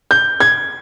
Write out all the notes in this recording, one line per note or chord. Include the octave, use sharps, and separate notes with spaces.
G6
G#6